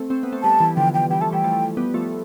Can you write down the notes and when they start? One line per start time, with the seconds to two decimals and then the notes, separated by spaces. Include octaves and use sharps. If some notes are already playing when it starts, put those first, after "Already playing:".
Already playing: A3 C4
0.10 A3 C4
0.23 B3
0.32 A3 C4
0.43 G3 B3 A5
0.60 E3 G3
0.77 D3 F3 G5
0.94 G5
1.10 E3 G3 G5
1.21 F3 A3 A5
1.32 E3 G3 G5
1.44 F3 A3
1.77 G3 B3
1.94 F3 A3